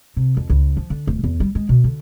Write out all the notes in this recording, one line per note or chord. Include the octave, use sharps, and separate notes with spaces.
C3
F2
C#2
F3
D3
D1
E2
G3
G#3
B2
D3